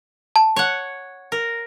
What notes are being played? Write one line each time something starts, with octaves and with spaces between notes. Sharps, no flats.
A5
C#5 F#5
A#4